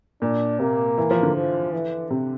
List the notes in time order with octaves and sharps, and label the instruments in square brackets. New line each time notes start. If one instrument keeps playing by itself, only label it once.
[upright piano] A#2 [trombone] D4
[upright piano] C3 [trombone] A#3
[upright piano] E3
F3
D3
[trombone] F3
E3
[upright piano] C3